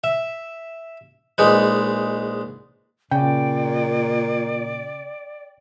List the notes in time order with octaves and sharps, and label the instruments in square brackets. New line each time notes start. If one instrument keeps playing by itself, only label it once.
[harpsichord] E5
A#1 G#3 D#4 B4
[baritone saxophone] A#2 [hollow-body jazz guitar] C#3 [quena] D5 [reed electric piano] G5